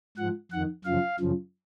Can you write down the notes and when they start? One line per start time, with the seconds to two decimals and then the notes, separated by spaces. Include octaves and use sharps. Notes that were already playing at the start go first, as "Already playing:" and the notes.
0.17 G#2 F3 F#5
0.51 F2 D#3 F#5
0.85 F#2 C#3 F3 F5
1.20 F#2 C#3 F3